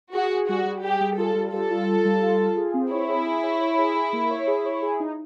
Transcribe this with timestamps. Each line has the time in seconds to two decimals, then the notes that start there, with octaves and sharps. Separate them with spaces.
0.14 F#4 G#4
0.31 G#4
0.48 G3 F#4
0.65 G3
0.84 G4 G#4
1.01 G3
1.18 F4 A4
1.35 G3
1.53 G3 A4
1.71 F4
1.87 F4
2.05 G3
2.22 F4
2.40 F4
2.57 G#4
2.74 C4
2.91 E4 C#5
3.09 G#4
3.26 G#4
3.43 C#5
3.61 C#5
3.78 G#4
3.95 G#4
4.13 A#3
4.30 C#5
4.47 G#4
4.65 C#5
4.82 G#4
5.00 D#4